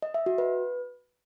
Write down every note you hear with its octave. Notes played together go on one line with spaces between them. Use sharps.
D#5
E5
F#4
B4